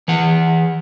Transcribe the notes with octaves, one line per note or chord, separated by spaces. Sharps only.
E3 F#5